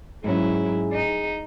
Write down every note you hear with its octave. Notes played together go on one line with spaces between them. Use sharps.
G#2 F#3 C#4 E4 G#4
D#4